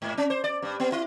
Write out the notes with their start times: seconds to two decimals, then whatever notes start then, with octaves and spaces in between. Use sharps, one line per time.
0.02 G#2
0.18 C#4
0.30 C5
0.44 D5
0.62 G2
0.80 B3
0.92 E4